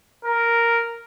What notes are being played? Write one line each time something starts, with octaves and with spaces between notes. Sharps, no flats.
A#4